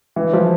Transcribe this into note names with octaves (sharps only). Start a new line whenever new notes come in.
E3
F3